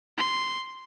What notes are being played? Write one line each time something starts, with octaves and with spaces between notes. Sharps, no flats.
C6